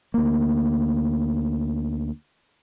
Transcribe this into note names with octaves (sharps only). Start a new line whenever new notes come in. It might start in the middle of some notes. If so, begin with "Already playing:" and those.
D2 A#3